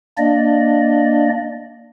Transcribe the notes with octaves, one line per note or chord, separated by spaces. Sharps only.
A#3 D4 D5 D#5